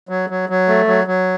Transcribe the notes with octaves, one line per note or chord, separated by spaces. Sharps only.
F#3
F#3
F#3
A3
F#3
F#3